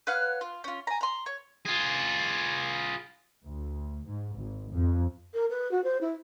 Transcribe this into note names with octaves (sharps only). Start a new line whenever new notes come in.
B4 C#5 F5 F#5
F4
C#4 F4
G#5 A#5
A#5 C6
C#5
F4 G#4
D2
G#2
G#1
F2
A#4
B4
F#4
C5
E4